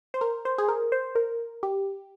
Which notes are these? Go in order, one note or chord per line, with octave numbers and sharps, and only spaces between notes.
C5
A#4
C5
G#4
A#4
C5
A#4
G4